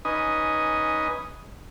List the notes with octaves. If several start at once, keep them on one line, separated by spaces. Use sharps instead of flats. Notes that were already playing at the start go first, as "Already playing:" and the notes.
C#4 D#4 B4 D#5 G#5